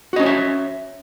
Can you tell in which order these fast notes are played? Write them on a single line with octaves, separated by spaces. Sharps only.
F#4 D#5 C#4 C#5 E5